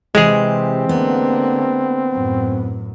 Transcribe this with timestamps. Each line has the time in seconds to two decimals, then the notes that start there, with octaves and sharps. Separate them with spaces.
0.15 C3 E3 G#3 C4 G4 G#4
0.89 D3 A#3 B3
2.12 F#2 A2